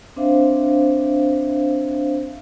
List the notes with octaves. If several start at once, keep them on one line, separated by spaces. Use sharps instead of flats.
C4 D4 C5 E5 F5